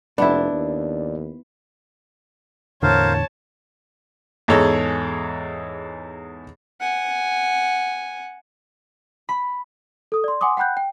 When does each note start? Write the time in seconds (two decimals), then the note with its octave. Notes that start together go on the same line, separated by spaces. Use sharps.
0.18 F1 B3 D4 E4 D5
0.52 D#2
2.83 E2 A2 D3 A#4 C5 C#5 F5 A5
4.48 E2 G#2 G#4 A4 C#5 A#5
6.80 F#5 G#5
9.29 B5
10.12 A4 D#6
10.24 D5 C6
10.41 F#5 G#5 C6 D6 D#6
10.57 F#5 G5 B5 F#6 G6
10.77 G5